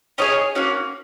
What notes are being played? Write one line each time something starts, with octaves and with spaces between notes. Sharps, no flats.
C#4 F4 G#4 C#5 D#5
A#3 C#4 F#4